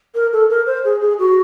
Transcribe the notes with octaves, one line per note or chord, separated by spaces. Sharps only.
A#4
A4
A#4
C5
G#4
G#4
F#4